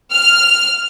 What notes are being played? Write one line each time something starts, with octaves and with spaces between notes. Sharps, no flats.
F6